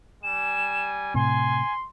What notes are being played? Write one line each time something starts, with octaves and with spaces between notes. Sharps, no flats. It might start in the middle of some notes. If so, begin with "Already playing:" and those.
G3 G#5 E7
A2 C3 G#5 C6